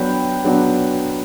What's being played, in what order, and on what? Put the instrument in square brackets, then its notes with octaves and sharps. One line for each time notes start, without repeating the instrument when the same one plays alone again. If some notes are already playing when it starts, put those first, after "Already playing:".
Already playing: [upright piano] F#3 B3 D4 F#4 [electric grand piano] G5 B5
[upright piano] F#3 B3 D4 F#4